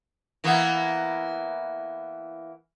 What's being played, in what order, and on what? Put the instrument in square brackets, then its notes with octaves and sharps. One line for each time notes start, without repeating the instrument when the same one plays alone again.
[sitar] E3 A#3 B3